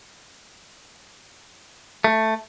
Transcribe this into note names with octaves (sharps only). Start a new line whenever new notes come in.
A3